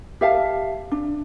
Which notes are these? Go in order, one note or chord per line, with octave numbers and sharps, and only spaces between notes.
G4 E5 F5 A5
D4